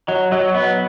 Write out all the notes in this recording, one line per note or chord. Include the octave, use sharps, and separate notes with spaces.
F#3 D#5
F#3 D#5
B3 D#5